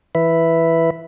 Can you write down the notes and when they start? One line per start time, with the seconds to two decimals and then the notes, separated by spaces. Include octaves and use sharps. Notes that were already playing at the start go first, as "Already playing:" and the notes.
0.15 E3 B4 E5